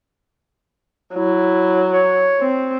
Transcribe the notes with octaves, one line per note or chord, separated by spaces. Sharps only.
F#3 E4
C#5
C4